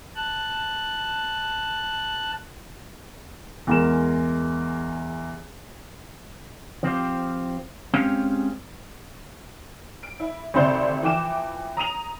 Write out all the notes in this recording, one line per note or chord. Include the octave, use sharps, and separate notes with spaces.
A5 F#6
E2 G#3 A#4 E7
F3 C4 F4 G4
G#3 C4 C#4 G4 F5
D7
E4
G#1 D2 C3 C5 D5 G6
E3 F3 G5 D6 E7
A#5 D#6 D#7 F7